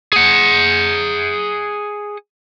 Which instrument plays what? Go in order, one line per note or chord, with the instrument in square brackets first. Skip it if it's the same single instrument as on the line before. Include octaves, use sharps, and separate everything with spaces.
[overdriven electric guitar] G#4 F#5